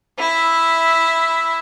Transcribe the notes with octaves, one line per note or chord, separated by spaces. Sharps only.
E4 E5